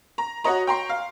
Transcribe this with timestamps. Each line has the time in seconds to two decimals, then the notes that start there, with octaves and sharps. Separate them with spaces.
0.18 A#5
0.44 F#4 C#5 D#5 A#5
0.67 G5 A#5 C6 C#6
0.89 F5